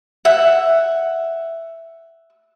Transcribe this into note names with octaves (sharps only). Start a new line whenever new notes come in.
E5 F#5